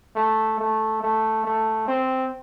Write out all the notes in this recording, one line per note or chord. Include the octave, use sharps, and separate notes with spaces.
A3
A3
A3
A3
C4